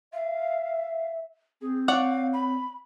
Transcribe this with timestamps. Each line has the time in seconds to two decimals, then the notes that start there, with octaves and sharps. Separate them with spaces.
0.13 E5 F5
1.62 C4 G#4
1.88 C#5 D5 F5 F#5
2.33 B5